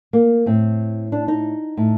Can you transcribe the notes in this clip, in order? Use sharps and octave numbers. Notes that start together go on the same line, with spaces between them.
A#3
A2 C4
D4
D#4
A2